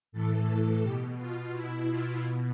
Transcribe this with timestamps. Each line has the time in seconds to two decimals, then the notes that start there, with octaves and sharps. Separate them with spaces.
0.12 A2 E3 A4
0.82 B2 G4
1.18 F4
1.52 B2 E4
1.89 F4
2.23 B2